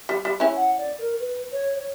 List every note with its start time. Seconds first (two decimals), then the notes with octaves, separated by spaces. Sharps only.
0.09 G3
0.25 G3
0.40 C#4 E4
0.56 F#5
0.77 D5
0.98 A#4
1.19 B4
1.52 C#5
1.78 C#5